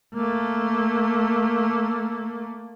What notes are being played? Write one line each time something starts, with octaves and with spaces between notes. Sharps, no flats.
A3 A#3